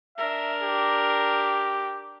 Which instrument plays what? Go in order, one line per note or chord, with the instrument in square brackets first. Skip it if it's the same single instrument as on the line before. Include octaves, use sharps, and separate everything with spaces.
[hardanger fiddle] D4 A#4 [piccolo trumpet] E5
[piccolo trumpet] G4